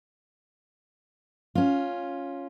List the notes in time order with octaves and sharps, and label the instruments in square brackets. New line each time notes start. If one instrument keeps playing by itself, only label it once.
[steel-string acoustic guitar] C#4 F4